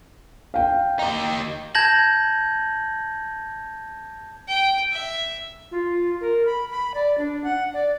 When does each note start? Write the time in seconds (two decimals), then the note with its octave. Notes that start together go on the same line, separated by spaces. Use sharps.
0.54 F5 G5
0.99 D#4 G4
1.75 A5 G6 G#6 A#6 F#7
4.48 G5
4.92 E5
5.71 F4
6.21 A#4
6.46 B5
6.71 B5
6.94 D5
7.18 D4
7.44 F#5
7.74 D5